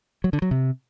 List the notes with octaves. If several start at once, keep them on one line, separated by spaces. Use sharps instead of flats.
F#3
D3
F#3
C3